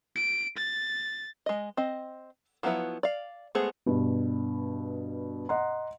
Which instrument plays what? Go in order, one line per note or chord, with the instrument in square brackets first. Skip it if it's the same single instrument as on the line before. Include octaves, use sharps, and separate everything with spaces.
[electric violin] D7
A6
[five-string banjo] G#3 D#5
C4 D#5
F3 F#3 B3 E4 B4
D5 F5
G#3 A3 B3 G#4 C5
[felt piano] G2 B2
D#5 F#5 A#5 C6